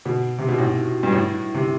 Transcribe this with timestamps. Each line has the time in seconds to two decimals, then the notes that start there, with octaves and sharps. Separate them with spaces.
0.06 B2
0.38 C3
0.48 B2
0.58 A2
1.03 G2
1.12 A2
1.54 C3